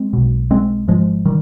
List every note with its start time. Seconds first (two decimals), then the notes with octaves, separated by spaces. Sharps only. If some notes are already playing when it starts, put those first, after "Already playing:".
Already playing: G#3 C4
0.13 B1 B2
0.51 G#3 C4
0.88 G#1 G#2 F3 G#3
1.25 D#3 G3